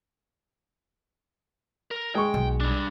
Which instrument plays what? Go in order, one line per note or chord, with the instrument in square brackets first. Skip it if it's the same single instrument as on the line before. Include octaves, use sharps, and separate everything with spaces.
[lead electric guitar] A#4
[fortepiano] G#3 C#6 [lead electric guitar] G5
[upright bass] B1
[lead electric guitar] G3 D4